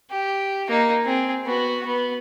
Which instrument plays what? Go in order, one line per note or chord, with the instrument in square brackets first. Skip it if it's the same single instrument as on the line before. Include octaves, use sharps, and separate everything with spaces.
[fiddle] G4
A#3 D#4
C4 G#4
B3 F#4
B3